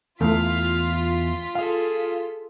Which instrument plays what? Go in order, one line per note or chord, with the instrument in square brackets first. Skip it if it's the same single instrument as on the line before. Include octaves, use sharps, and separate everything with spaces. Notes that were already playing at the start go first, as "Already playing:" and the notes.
[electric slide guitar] E2 E4 [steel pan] A3 [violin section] F4 B6 [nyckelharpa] F5
[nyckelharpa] G#4 A4 [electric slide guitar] F5